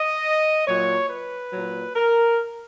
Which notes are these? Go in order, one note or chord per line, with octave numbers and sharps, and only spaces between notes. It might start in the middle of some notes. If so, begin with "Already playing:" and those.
Already playing: D#5
A#2 F#3 C#5
B4
A#2 F#3
A#4